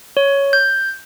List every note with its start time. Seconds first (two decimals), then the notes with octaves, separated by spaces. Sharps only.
0.17 C#5
0.53 G6